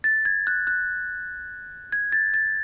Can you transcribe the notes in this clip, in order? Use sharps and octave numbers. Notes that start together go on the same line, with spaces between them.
A6
G#6
F#6
F#6
G#6
A6
A6